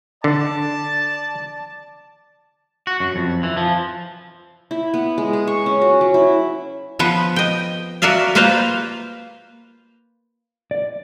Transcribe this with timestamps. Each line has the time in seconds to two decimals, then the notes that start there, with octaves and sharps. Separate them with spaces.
0.24 D3 D5 A5
2.87 F#4
3.00 F#2
3.16 F2
3.43 E3
3.57 F3
4.71 E4
4.94 B3
5.18 G#3
5.33 G#4
5.47 C#6
5.66 C#4
5.81 F#4
6.01 F#3
6.14 E4
6.99 F3 B3 B4
7.36 D#5 G5
8.02 F#4 A#4 D5 E5 F5
8.35 A#3 F4 B4 C5 F5 A#5
10.71 D5